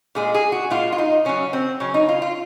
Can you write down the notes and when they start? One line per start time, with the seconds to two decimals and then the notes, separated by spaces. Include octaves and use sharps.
0.15 A#2 G#3 G#4
0.34 G#4
0.52 F#4
0.70 A#2 G#3 F4
0.92 F4
0.98 D#4
1.25 C#3 F#3 C#4
1.53 C4
1.80 C#3 F#3 C#4
1.94 D#4
2.09 F4
2.22 F4